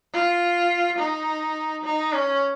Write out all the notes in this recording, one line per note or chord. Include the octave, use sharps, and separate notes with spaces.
F4
D#4
D#4
C#4